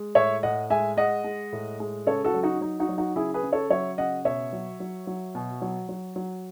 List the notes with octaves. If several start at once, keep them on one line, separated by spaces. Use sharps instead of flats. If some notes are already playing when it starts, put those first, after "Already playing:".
Already playing: G#3
A2 C#5 E5
A2 D#5 F#5
G#3 E5 G#5
G#3 D#5 F#5
G#3
A2
G#3
C#3 A4 C#5
F#4 A4
F#3
D#4 F#4
F#3 D#4
D#4 F#4
F#3
D#4 F#4
C#3 E4 G#4
G#4 B4
C#3
A4 C#5
F#3 C#5 E5
C#3 D#5 F#5
B2 C#5 E5
F#3
F#3
F#3
B2
F#3
F#3
F#3